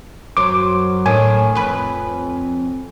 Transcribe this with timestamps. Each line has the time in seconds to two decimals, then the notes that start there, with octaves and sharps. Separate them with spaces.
0.37 F#2 F#3 C5 D6
1.06 A2 D#3 D4 G#5
1.55 F2 B4